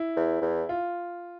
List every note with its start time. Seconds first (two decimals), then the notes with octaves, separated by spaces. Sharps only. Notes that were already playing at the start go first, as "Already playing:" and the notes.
Already playing: E4
0.16 E2
0.42 E2
0.69 F4